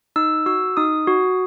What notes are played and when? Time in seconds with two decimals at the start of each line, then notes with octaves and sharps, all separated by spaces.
0.16 D#4 E6
0.46 F#4 E6
0.77 D#4 D#6
1.07 F#4